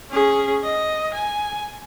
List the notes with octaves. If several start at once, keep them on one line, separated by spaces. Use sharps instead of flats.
C#4 G#4
D#5
G#5